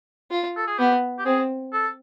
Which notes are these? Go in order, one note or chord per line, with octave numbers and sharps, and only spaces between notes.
F4
A4
G#4
B3 G4
G4
C4 G#4
A4